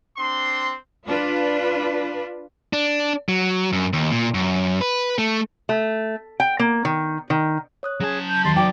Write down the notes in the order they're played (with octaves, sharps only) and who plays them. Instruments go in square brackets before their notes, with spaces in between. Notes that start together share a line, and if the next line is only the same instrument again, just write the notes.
[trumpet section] C4 D4 C6
[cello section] D4 F4 B4
[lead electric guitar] D4
F#3
F#2
D#2
A#2
F#2
B4
A3
[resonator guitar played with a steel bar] A3
G5
A#3
D#3
D#3
[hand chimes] C#5 D#6 F#6
[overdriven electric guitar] F#3 A5 [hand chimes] C#4 [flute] G#4
[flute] G6
[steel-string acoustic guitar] D#2 [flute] C6 [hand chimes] A6
[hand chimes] D#4 F#4 D5 [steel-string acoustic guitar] G5 [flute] D6